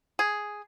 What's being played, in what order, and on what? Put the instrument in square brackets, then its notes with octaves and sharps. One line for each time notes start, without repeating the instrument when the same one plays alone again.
[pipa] G#4